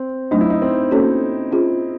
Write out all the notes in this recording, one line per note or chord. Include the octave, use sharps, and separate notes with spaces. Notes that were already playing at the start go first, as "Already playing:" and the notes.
Already playing: C4
F#3 A3 D4 D#4
E4
D#4
C4
A#3 C#4 F#4 A4 C#5
C#4 F4 G#4 C5